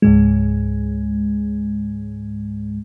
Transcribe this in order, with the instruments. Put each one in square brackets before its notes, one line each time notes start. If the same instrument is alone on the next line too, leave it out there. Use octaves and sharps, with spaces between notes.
[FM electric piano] C#2 G#2 G#3